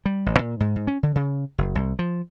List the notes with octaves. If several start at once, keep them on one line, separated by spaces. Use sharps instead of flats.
G3
A1
A#2
G#2
G#2
C#4
D3
C#3
F#1
C2
F3